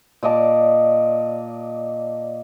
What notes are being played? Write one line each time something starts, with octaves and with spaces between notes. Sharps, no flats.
A#2 D5 D#5 A5